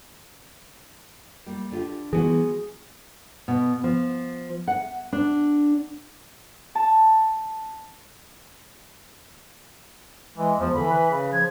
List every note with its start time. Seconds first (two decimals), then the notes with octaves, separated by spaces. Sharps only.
1.46 G3 A#3
1.72 D3 F4 G4
2.13 E3 G3 G#3 B3 F#4 G#4
3.48 B2
3.84 F3
4.67 F#5
5.13 D4
6.75 A5
10.36 E3 G#3
10.60 E2 F3
10.74 D3 E3 B5
10.90 B4
11.11 C#3
11.33 F3 G#6